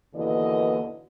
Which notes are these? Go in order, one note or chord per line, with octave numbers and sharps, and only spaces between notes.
D#2 B2 D3 E3 A#3 D#5